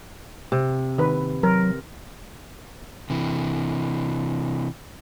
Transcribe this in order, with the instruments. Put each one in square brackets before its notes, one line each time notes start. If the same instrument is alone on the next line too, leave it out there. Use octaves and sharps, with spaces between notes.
[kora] C3
[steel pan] D#3 B4
[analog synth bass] F#3 [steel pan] A#4
[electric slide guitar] C3 E3